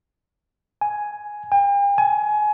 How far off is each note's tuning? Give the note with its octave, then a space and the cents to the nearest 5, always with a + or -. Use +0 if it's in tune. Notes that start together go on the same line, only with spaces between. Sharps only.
G#5 +5
G5 +45
G#5 +25